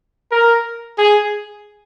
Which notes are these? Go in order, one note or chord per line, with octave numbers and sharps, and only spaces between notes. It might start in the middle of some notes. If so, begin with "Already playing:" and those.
A#4
G#4